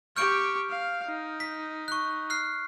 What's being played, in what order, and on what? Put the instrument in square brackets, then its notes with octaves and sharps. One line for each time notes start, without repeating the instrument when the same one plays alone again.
[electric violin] G4 C#6 [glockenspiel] F6 G6 D7
[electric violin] F5
D#4
[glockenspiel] B6
C#6 F#6
F6 F#6 C7